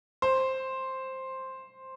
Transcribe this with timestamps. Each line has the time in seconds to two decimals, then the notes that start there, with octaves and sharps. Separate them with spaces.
0.22 C5